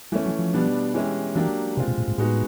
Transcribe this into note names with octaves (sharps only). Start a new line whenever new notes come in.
E3 G3 A3 C#4
F#3
F3
B2 G3 B3 D4
E3 G#3 C#4 E4 G4
E3 F#3 A#3 D4 G4
C3 G#3 C4 F4
B2
A#2
A2
A2 G#3 B3 D#4 F#4 B4